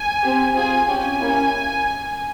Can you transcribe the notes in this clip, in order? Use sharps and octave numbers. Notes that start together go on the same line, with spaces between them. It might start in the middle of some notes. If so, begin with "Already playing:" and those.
Already playing: G#5
C4 G4
C4 F4 G#4 G#5
C#4 G4 G#5
A#3 C#4 E4